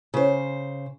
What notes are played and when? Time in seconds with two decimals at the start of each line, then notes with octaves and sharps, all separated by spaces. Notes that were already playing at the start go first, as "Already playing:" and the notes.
0.14 C#3 C5